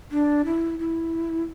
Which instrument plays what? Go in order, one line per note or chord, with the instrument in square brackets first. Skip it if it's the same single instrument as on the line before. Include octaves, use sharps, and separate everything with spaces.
[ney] D4
E4
E4